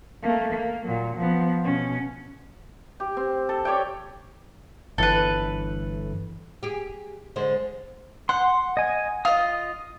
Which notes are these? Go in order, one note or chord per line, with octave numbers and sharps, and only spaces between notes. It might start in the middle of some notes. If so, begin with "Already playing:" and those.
A3 A#3
A#3
A#2 F#3
F3 B3
B2 C#4
G4
C4
A4
G4 C#5 D5 G5
G1 E3 A4 B4
G4 G#4
D3 G#3 C5
F#5 C6
D#5 G#5
F4 D#5 D#6